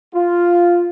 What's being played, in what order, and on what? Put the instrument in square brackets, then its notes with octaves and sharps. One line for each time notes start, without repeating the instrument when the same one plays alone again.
[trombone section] F4